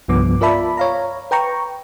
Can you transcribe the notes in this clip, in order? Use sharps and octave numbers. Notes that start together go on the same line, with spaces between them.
C2 G2 F3 B3 D6
F4 A#4 D5 E5 A5 B5
C#5 F5 A#5
B4 G5 A#5 C#6